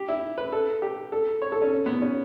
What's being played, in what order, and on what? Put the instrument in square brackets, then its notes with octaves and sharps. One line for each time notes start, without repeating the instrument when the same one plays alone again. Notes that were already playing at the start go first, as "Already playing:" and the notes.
Already playing: [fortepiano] G4
E4
B4
A4
G4
A4
C#5
A4
C#4
B3
C#4